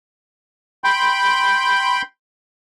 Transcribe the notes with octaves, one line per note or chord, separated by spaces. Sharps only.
G5 B5 C6 G6